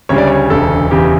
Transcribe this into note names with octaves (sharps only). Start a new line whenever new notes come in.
D2 C#3 G3 C#5
D5
C#5
E1 D2 C#3 A4
E1 E2 C#3 G4